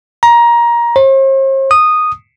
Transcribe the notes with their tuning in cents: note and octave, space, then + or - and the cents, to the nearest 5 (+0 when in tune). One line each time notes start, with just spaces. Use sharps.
A#5 +20
C5 +45
D#6 -10